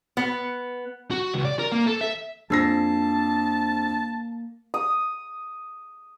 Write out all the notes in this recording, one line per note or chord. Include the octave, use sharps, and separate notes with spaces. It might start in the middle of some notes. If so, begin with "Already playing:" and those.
B3
F#4
C#2
D5
A#4
A#3
A4
E5
F2 A#3 D4 A5 E6 A#6 C7
D#6